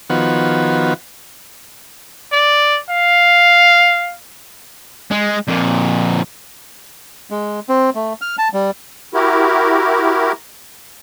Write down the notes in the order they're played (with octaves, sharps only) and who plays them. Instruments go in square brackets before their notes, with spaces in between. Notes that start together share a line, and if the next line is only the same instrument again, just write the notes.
[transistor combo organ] D#3 F3 B3 F#4
[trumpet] D5
F5
[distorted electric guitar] G#3
F2 A#2
[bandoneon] G#3
C4
A3
F6
A5
G3
[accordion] E4 F#4 G4 A#4